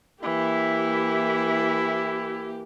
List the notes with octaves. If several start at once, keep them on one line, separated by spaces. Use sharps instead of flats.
E3 A#3 E4 G4